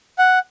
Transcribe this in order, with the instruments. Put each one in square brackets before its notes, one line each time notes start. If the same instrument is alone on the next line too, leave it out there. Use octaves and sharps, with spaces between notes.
[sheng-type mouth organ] F#5